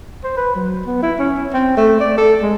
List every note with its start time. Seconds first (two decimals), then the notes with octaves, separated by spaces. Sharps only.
0.24 C5
0.37 B4
0.55 F#3
0.86 B3
1.03 E4
1.19 C#4
1.54 C4
1.77 A3
2.01 D5
2.18 A4
2.42 G#3